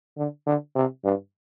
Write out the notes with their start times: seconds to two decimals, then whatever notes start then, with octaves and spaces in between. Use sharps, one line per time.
0.18 D3
0.46 D3
0.76 C3
1.04 G2